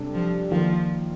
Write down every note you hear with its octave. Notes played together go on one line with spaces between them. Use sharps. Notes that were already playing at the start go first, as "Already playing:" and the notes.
Already playing: C3 G3 D4 A4 D5
F3
D#3 F3 A#3 F4 A#4 D5